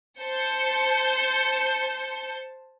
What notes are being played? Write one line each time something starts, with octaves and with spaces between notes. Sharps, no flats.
C5 A5 G6 C#7